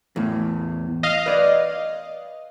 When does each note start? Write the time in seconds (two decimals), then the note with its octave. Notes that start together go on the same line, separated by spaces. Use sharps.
0.16 E2 A2
1.03 D#5 F5
1.26 B4 D5